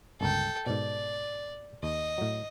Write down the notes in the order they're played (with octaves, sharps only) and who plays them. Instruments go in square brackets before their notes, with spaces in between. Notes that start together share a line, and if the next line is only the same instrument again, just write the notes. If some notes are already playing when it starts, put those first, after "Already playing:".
[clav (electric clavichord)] G1 C#2 A#4 [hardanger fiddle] A4 G5
[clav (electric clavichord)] G#2 B2 [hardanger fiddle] D5
[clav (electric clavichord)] D#2 [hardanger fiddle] D#5
[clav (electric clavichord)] A2 F#3